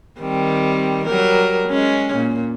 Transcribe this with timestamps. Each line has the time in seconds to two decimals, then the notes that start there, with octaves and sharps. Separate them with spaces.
0.20 D#3 G3 C4
1.06 F#3 G3 A#4
1.68 G#3 C#4
2.15 A#2